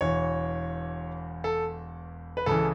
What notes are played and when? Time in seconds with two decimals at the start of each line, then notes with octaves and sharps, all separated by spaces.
0.01 E1 E2 E3 C#5
1.44 A4
2.37 B4
2.46 C#2 C#3 E3 A4